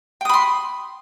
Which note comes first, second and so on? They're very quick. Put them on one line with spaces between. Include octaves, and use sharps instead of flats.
G5 D#6 B5 C6